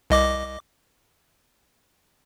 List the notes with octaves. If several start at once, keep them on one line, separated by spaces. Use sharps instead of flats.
C2 D#5 D6